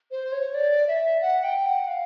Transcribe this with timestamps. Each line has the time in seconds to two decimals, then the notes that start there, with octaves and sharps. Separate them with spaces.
0.11 C5
0.32 C#5
0.54 D5
0.88 E5
1.22 F#5
1.44 G5
1.66 F#5
1.88 F5